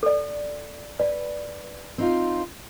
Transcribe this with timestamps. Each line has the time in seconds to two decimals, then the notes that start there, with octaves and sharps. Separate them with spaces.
0.03 A4 D5
1.00 B4 D5
1.98 C4 D#4 F4